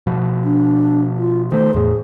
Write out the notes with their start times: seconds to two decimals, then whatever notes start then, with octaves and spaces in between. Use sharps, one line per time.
0.07 B2 F3
0.44 D4
1.18 F4
1.52 D#3 A3 C5
1.74 E2 A2 G#4